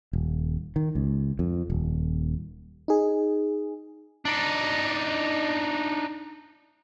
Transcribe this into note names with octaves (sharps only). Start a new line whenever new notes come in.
D#1
D#3
C#2
F2
D#1
D#4 G#4
D4 D#4